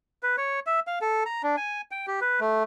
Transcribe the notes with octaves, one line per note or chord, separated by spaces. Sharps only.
B4
C#5
E5
F5
A4
A#5
D4
G#5
G5
G4
B4
A3